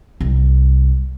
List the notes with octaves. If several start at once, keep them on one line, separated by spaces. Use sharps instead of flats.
C2